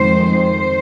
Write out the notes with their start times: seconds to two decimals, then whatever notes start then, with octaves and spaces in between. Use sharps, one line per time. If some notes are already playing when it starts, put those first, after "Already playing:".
Already playing: F2 D#3 G#3 C5
0.30 C5